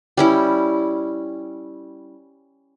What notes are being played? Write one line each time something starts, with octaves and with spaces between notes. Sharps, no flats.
G3 C#4 E4